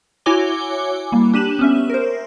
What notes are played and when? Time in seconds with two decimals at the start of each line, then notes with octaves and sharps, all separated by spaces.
0.26 E4 F#4 C#5 G#5 D6 G7
1.12 G3 A#3
1.34 D4 G4 D#7 E7 F#7
1.59 B3 C#4 E5
1.90 A#4 C5